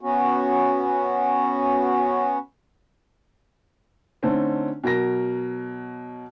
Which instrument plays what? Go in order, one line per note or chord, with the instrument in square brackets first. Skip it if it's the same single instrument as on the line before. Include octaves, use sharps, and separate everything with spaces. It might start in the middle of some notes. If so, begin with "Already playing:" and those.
[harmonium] B3 C#4 F#4
[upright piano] D3 A3 C4 C#4 D#4
B2 F#3 A#4 A#6